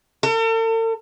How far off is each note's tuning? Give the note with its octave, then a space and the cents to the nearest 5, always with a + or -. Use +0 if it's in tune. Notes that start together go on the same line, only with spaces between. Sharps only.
A4 +45